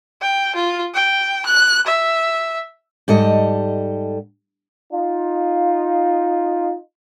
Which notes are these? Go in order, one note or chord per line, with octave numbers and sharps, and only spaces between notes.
G5
F4
G5
F#6
E5
G#2 G3 A4 D#5
D#4 F4